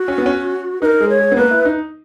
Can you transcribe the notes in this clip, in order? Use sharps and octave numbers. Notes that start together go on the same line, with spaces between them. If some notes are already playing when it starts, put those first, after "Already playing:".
Already playing: F#4
C#4
B3
C#4
D#4 A#4 B4
G#3
C#5
G#3
B3
A#3 B4
E4
D#4